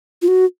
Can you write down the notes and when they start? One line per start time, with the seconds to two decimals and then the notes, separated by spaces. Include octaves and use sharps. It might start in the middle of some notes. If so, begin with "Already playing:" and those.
0.22 F4
0.28 F#4